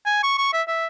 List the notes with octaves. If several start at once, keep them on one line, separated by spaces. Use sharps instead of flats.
G#5
C#6
C#6
E5
E5